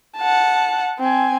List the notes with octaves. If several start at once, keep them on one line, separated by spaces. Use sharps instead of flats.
F#5 A5
C4 G#5